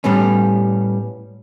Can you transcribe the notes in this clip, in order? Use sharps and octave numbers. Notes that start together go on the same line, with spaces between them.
A2 G3 B3 C#4